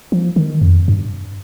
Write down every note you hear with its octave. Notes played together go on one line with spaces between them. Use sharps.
F3
D#3
F2
G2